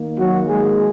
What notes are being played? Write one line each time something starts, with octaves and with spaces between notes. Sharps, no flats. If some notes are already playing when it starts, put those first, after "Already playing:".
Already playing: D#3 A#3
F#3 F#4
G#3 G#4